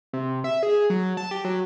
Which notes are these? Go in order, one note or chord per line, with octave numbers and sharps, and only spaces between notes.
C3
E5
G#4
F#3
A5
G4
F#3